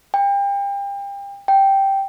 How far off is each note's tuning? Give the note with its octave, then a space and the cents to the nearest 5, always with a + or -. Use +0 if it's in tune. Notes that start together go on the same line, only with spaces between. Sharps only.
G5 +35
G5 -5